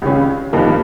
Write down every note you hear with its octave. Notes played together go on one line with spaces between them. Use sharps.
C#2 C#3 G3 C#4
G2 F3 A#3 D#4